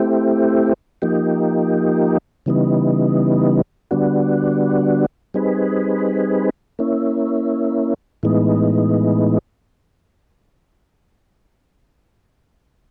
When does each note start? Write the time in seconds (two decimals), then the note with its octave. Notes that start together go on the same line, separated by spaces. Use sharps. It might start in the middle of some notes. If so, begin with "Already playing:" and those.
Already playing: A3 C4 E4 G4
1.02 F3 A#3 D#4 G4
2.46 C#3 E3 G3 B3 D#4
3.91 D3 G3 B3 D4 F#4
5.34 G3 C4 D#4 G#4 B4
6.79 A#3 C#4 E4
8.23 A2 E3 G#3 B3 D#4